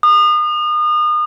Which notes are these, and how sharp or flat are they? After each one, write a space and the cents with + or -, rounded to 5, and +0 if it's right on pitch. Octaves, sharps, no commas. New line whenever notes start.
D#6 -35